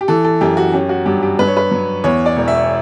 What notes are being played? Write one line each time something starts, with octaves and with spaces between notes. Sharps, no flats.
G4
E3 A4
A4
F#2 G4
F#4
C#4 G4
F#4
G2 G4
G4
G2 B4
C#5
B4
F#3
E2 C#5
D5
E1
E5